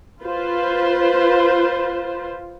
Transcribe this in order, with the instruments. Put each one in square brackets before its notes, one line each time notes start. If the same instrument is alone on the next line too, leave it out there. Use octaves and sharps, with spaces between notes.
[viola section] F4 B4 C5